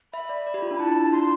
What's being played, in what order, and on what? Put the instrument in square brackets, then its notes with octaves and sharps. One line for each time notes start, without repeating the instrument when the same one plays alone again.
[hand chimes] E5 [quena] B5
[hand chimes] D5
D5
G4
F4
D4
[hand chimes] E4 [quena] A5
[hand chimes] D4
[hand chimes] F4 [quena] C6